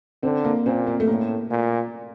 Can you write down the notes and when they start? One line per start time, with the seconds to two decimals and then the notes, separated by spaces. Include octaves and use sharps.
0.23 D3 C4
0.45 A#3
0.66 A#2 C4
0.87 A#3
1.00 A3
1.08 A2 A#3
1.51 A#2